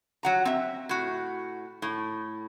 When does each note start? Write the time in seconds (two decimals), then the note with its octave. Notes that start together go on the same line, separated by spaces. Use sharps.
0.23 F#3 F#5 A#5
0.45 C4 E5
0.89 A2 F#4
1.82 A2